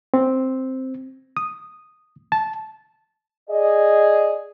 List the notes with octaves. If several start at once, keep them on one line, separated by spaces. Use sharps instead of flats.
C4
D#6
A5
G#4 D5 D#5